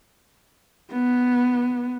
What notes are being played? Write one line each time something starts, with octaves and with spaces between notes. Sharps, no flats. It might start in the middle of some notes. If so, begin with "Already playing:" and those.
B3